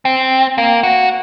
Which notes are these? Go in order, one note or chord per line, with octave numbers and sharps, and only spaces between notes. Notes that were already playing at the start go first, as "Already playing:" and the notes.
C4
A#3
F#4